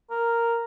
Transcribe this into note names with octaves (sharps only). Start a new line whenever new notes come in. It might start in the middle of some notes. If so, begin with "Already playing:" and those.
A#4